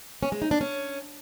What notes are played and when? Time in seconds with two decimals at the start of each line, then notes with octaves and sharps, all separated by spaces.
0.23 C#4
0.32 G#3
0.42 D#4
0.51 D4
0.61 C#4